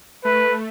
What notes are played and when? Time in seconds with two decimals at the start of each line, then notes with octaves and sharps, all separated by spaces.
0.25 A3 B4